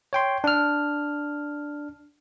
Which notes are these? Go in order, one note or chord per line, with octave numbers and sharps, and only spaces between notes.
C#5 G5 C6
D4 F6